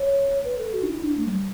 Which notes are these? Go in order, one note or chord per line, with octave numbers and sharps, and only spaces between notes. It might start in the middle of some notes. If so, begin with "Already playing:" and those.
Already playing: C#5
B4
A4
F#4
D4
E4
D4
A3
F#3
G3